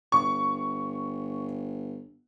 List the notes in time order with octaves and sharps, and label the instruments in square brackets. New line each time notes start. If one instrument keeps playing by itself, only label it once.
[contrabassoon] G1 [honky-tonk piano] C#6